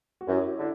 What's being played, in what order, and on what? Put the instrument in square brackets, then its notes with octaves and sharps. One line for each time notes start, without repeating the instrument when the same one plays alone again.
[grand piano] F#4
[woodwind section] F#2 [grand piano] E4 G4
[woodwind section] D3 [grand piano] E4 G4